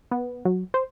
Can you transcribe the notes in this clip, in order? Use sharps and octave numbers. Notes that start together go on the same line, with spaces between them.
B3
F#3
C5